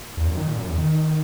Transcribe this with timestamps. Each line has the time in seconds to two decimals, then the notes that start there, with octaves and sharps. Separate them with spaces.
0.17 E2
0.28 F#2
0.37 D#3
0.48 A#2
0.58 F#2
0.68 E2
0.78 D#3